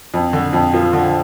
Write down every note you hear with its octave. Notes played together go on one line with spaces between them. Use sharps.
F2
D3
F2
F3
D3